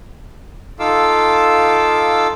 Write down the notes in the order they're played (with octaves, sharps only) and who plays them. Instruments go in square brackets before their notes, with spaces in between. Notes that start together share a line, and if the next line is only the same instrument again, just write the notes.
[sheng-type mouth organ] D#4 F4 A4 F5 D6 E6